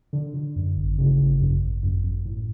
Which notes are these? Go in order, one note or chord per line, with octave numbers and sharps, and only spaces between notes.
D3
D3
F#2
G#1
C#3
G#1
F#2
G#1
F#2
F#2
A2